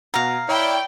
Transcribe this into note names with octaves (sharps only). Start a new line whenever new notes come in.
B2 F5 F#5 A#5
E4 C#5 D5 G5 B5